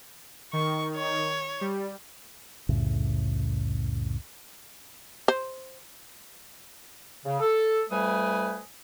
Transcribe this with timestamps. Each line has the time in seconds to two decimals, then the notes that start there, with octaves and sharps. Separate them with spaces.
0.53 D#3 C#6
0.97 C#5
1.61 G3
2.69 C2 F2 A2 C#3
5.28 C5
7.26 C#3
7.40 A4
7.90 F2 G3 A3 B4 G#5 D#6